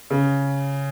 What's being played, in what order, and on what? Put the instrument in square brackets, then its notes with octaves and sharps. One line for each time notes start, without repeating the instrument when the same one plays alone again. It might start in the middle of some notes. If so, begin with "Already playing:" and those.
[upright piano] C#3